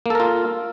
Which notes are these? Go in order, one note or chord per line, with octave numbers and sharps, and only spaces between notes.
A#3 F4 A4 A#4